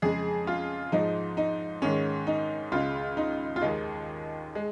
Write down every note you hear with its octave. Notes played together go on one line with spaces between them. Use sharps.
F2 C#3 G#3 G#4
F4
G#2 F3 G#3 D#4
D#4
G#2 D#3 G#3 C#4
D#4
C#2 C#3 G#3 F4
D#4
F4
D#2 D#3 G#3 D#4
G#3